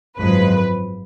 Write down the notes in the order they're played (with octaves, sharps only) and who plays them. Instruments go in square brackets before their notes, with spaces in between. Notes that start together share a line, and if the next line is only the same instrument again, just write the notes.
[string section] G#1 F#2 F3 G#3 B4